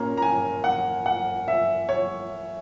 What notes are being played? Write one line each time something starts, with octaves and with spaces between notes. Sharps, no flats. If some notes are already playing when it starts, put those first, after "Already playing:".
Already playing: A#2 A#3 C#4 A#5
A#5
G#5
F#5
F#5
E5
C#5